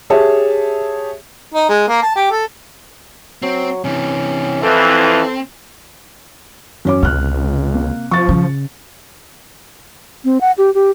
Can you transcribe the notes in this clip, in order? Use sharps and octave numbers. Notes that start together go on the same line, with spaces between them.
G4 G#4 C#5 E5 A5
D#4
G#3
A#3
A5
G4
A4
F#3 C4
C3 E3 C#4
F2 E3 C4 A4
F#2 C#4 D6
C#2 C3 F6 F#6
A#3
F3 C#6 A6
C#3
C4
F#5
G4
G4